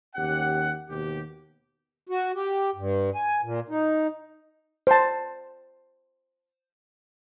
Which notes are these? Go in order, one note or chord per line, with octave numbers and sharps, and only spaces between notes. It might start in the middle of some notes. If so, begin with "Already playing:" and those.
D#2 C#4 G4 F#5
D#2 B2 G4
F#4
G4
G2
G#5
A#2
D#4
C5 A5